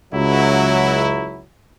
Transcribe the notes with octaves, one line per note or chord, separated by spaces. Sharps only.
C#2 F#3 E4